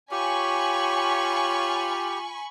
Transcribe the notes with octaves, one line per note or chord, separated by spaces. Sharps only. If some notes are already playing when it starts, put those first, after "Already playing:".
F4 G4 C#5 G#5 B5 C#6